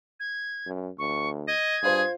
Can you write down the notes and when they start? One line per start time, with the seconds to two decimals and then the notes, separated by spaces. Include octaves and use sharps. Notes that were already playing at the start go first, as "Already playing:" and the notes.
0.20 G#6
0.66 F#2
0.99 D2 C#6
1.48 D#5 G#6
1.83 G2 F4 G#4 C5